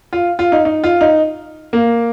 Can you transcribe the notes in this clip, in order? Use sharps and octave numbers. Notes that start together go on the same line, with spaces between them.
F4
F4
D#4
D#4
F4
D#4
A#3